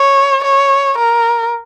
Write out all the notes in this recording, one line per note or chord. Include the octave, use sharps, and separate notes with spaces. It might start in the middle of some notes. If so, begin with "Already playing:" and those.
Already playing: C#5
C#5
A#4